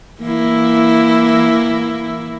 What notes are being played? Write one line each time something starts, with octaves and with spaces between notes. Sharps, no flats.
E3 A#3 E4